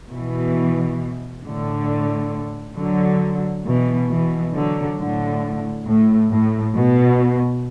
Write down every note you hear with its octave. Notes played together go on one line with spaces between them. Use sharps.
B2 E3
A2 D3
D3 F#3
B2 E3
B2 E3
D3 F#3
A2 D3
A2
A2
B2